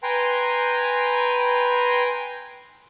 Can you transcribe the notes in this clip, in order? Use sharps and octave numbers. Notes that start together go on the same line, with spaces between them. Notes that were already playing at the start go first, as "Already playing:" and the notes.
B4 G5 G#5 A#5 C6